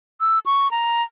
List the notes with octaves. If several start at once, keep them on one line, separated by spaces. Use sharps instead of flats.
E6
C#6
A#5